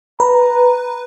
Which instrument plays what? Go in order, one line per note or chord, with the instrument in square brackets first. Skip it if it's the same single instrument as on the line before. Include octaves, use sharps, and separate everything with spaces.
[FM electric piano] B4 [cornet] A#5